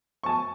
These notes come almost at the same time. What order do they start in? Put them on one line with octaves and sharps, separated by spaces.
C#6 A5 G#5